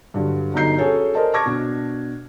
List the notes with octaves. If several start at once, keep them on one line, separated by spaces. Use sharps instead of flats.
G2 D3 F#3
G1 F#3 D#4 A#5 G6 C7
C#4 F#4 G#4 A4 C#5
A#4 C5 D5 D#5 A5
A5 C#6 D6 F6 G#6 A#6
B2 D4